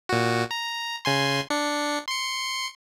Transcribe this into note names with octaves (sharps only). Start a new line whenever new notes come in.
A#2 F#4
A#5
C#3 G#5 C6
D4 C#7
C6 C#7